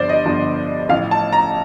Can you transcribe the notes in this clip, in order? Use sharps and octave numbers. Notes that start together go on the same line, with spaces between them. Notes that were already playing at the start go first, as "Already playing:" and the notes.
Already playing: G1 G2 D3 F3 C5 D5
D#5
G1 G2 D3 F3
A1 A2 F3 F5
A5
A#5